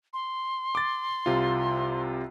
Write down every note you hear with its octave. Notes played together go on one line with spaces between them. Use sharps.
C6
D6 A6
C2 C3 F4